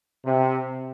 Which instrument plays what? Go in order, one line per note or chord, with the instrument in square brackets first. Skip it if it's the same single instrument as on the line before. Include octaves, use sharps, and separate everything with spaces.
[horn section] C3